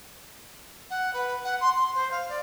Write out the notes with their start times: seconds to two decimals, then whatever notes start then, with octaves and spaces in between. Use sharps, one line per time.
0.90 F#5
1.14 B4
1.44 F#5
1.61 C6
1.76 C6
1.95 C5
2.11 F5
2.29 D5